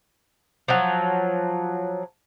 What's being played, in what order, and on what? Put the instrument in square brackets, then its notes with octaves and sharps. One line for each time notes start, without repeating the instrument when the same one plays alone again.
[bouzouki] F3 F#3